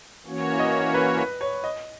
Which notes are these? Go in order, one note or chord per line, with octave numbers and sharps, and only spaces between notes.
E3 A#3 C#4 F#4 C#5
D#5
B4
B4
C#5
D#5